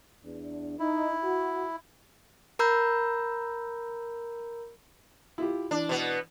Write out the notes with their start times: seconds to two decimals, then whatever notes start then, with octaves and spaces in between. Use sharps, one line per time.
0.25 E2 D4
0.79 D#4 E4
1.24 F#4
2.59 A#4 A#5 B5 E6 G6
5.38 E4 F4 G4
5.71 E3 D4
5.89 B2 B3